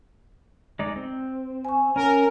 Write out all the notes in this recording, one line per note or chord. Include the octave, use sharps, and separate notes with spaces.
G#3 D#4 D5
C4
G#5 C#6
C#4 A#4 G#5